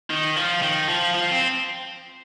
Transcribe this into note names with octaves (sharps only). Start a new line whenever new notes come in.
D#3
F3
D#3
F3
F3
C4